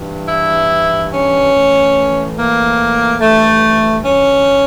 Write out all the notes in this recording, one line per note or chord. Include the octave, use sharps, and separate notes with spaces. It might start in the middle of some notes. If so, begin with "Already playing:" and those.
Already playing: G2 E3
E4
C#4
A2 E3
A#3
G2 E3 A3
C#4